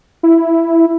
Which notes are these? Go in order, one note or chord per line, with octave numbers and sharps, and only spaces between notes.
E4